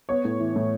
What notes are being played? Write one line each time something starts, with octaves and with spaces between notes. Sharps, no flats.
B3 C#5
A2
E3
A2